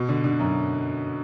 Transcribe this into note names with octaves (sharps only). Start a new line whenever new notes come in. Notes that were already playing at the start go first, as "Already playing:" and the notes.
Already playing: B2
D3
D3
F#2